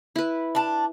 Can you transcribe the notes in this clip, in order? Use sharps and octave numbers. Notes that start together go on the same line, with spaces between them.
E4 B4
D4 A5